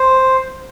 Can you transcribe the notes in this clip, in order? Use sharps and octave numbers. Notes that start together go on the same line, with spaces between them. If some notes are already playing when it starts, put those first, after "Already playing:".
Already playing: C5